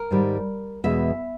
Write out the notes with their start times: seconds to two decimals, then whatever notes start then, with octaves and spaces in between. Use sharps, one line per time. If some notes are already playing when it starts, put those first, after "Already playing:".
Already playing: A#4
0.11 G#2 D#3 G3
0.84 E2 B2 G#3 E5